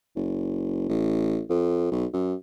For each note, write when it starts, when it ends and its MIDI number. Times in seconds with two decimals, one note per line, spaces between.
0.16 0.88 30
0.89 1.40 33
1.49 1.88 41
1.91 2.05 35
2.13 2.34 42